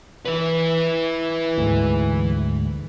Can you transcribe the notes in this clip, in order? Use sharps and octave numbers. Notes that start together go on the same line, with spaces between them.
E3 B4
D2 G#2 G#3